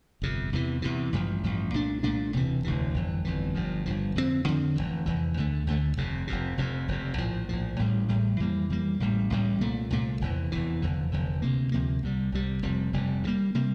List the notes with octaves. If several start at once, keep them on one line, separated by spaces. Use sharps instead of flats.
G1 F2 C3
E2 C3 E3
E2 C3 E3
A1 G2 F3
A1 G2 F3
C2 A#2 A3 D4
C2 A#2 A3 D4
E1 D2 C3 E3
E1 D2 C3 E3
G1 F2 E3
G1 F2 E3
G1 G2 F3
G1 G2 F3
F2 D3 F3 C4
F2 D3 F3 C4
F1 E2 E3
F1 E2 E3
D2 D3 A3
D2 D3 A3
F1 F2 C3
F1 F2 C3
F1 F2 C3
F1 F2 C3
A#1 A2 F3
A#1 A2 F3
A1 A2 G3
A1 A2 G3
F2 E3 G3 A#3
F2 E3 G3 A#3
A1 A2 G3
A1 A2 G3
C2 A#2 A3
C2 A#2 A3
F1 E2 E3
F1 E2 E3
F1 E2 D3
F1 E2 D3
D2 C3 F3 A#3
D2 C3 F3 A#3
C2 C3 G3
C2 C3 G3
F1 F2 C3 G3
F1 F2 C3 G3
E2 C3 G3 A#3
C3 G3 A#3